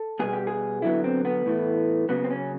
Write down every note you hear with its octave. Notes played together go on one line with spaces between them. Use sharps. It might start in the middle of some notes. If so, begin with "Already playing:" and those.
Already playing: A4
B2 G3 B3 G#4
G4
G#4
D3 F#3 B3 E4
C4
B3
A2 E3 A3
C#3 F#3 A#3 B3
C4
C#4